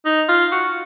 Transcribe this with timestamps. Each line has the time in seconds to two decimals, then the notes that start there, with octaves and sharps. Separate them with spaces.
0.05 D#4
0.28 F4
0.52 F#4